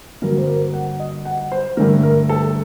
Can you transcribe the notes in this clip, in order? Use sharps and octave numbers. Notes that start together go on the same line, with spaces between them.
G2 D3 F#3 A#3 A#4
C5
A#4
F#5
D#5
F#5
C5
G2 D3 A3 A#4
A#4
A4